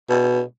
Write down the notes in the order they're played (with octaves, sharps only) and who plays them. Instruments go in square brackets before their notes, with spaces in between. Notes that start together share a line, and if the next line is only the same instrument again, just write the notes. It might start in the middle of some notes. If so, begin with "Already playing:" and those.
[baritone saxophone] B2